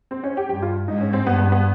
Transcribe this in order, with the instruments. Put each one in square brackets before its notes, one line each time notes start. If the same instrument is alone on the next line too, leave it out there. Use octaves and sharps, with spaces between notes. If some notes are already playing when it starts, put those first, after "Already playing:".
[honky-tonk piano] C4
C#4
G4
[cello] G2 [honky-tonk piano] G4
[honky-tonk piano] F4
[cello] G#2 [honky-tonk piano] D#4
[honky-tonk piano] C#4
C4
[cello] G2 [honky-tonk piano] B3
[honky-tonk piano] B3
B3